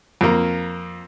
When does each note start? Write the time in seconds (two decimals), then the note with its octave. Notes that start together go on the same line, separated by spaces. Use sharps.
0.21 F2 A#3